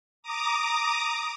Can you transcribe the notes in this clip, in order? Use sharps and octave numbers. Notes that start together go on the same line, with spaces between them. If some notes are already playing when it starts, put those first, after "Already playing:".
A#5 D6 D#6